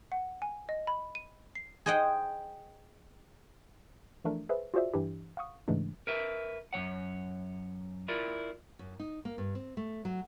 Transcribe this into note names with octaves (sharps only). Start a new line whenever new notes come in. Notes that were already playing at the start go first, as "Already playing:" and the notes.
F#5
G#5
D#5
B5
D#7
C7
G#4 C5 D#5 F#5 G5
E3 F3 A3 D4 A#4
G#4 B4 C5 E5
F4 F#4 G#4 C5 D5 E5
G2 E3 D4 E4 G4
F5 F#5 C#6 D#6
G#2 C#3 E3 G#3 A3 D4
A#4 B4 E5
F#2 F3 C#5 F#5
E4 F4 A#4 D5
F#2
D#4
A#3
G2
C4
A3
F#3